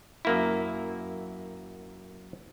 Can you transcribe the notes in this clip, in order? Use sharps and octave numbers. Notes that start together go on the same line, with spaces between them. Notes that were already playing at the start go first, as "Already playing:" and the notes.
F#2 A#3 E4